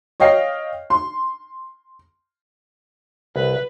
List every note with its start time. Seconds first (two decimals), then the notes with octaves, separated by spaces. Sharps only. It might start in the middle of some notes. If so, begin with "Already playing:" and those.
0.20 C#5 D#5 F5 G5 C7
0.90 C6
3.36 C2 B4